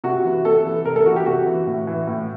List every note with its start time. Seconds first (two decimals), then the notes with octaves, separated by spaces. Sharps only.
0.04 C3 F#4
0.24 E3
0.45 C3 A4
0.65 E3
0.85 C3 A#4
0.96 A4
1.06 E3 F#4
1.16 G4
1.26 C3 F#4
1.46 E3
1.67 A2
1.87 E3
2.07 A2